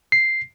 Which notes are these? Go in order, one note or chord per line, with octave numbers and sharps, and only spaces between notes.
C7